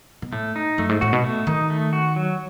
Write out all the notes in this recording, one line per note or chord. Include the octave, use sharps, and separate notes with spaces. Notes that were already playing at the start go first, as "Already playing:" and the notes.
B2
A2 A3
D#4
F#2 A3
G#2
A2 F#4
B2
A3
D#3 D#4
A3
F#4
F#3